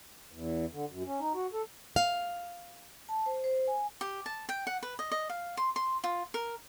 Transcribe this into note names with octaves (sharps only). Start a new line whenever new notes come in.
E2
D3
F#2
C#4
D#4
F#4
A4
F5
A5
C5
C5
G#5
G4
A5
G5
F#5
B4
D#5
D#5
F5
C6
C6
F4
A#4